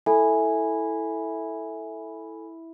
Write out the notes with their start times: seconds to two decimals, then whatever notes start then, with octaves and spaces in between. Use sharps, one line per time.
0.06 E4 A4 G#5